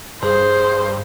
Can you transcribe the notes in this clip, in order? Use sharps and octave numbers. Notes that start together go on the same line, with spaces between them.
G2 G#4 C5